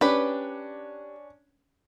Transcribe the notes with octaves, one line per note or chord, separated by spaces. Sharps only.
C#4 D4 G4 B4